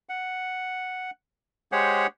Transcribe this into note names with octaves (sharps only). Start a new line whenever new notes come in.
F#5
G#3 G4 G#4 C5 C#5 F#5